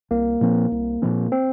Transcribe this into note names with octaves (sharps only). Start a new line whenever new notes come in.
C2 A#3
A#2 F3 C4
C2
A#2 F3 C4
C4